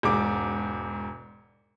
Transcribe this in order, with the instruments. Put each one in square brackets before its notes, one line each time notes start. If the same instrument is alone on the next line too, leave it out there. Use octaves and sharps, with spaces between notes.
[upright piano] E1 G#2 D6